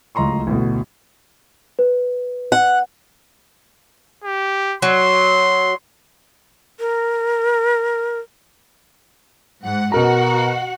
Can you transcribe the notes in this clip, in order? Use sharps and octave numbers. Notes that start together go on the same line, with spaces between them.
D1 C#2 D#5 A#5 C6 C#6
A1 D2 B2
B4
F#5
G4
F#3 C6
A#4
G#2 F#5
B2 F#4 A#4 F#5 A#5